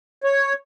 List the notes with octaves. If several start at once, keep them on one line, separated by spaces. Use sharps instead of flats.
C#5